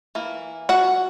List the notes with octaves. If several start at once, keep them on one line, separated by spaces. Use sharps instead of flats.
E3 A#3
F#4 F#5